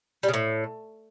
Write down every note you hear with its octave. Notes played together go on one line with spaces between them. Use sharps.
G3
C#3
A2